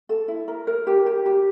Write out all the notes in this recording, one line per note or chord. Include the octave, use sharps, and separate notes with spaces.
A4
E4
A#4
A#4
G4
G4
G4